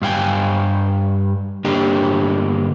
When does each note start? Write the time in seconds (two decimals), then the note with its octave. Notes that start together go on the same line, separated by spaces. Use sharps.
0.02 G2 F5 G5 G#5
1.65 G2 D3 A#3 D4 G4